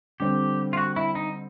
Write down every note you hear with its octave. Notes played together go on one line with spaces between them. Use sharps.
D3 G3 C4 G4
F4
F#4
E4
D#4